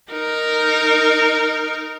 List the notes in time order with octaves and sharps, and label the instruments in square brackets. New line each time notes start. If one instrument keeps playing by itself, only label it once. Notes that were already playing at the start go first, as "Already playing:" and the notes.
[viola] D#4 A#4